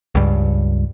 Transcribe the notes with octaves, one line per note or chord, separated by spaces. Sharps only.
C#2 G2